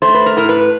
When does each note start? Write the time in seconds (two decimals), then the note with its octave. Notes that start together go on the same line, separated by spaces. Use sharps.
0.02 A3 C5
0.14 B4
0.26 A#4
0.37 A2 A#4
0.49 B4